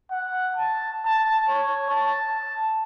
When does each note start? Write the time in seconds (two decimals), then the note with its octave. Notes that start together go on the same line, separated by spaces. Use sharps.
0.11 F#5
0.57 A5
1.05 A5
1.49 C#5
1.90 A5